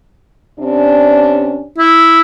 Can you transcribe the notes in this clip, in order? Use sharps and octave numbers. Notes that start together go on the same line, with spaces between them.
C3 C#4 D4
E4